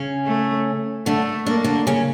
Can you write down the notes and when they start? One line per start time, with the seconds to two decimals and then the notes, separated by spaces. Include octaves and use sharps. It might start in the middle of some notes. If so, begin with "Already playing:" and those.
Already playing: C#3 C#4
0.26 A3
1.06 D3 A3 D4
1.46 A#3 D4
1.64 D3 D4
1.87 C#3 C#4